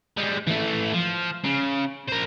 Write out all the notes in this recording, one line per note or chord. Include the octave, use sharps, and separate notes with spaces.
G3 G#3
E3 A3
F3
C#3
A#4 C5